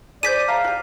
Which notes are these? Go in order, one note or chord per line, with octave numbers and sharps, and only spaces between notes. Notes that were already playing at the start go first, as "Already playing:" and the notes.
G#4 C5 D5 G6 B6 D#7
E5 F5 A5 A#5
F#4 G4